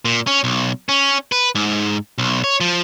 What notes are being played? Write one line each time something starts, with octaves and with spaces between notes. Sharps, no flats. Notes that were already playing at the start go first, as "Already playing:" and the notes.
A#2
C#4
B1
C#4
B4
G#2
B1
C#5
F3